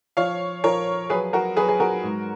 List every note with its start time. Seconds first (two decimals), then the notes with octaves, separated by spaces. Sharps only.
0.17 F3 C#5 F5
0.64 F3 A#4 C#5
1.10 F#3 G#4 B4
1.33 F#4 A#4
1.57 F#3 G#4 B4
1.69 G#4
1.80 F#4 A#4
2.03 G#2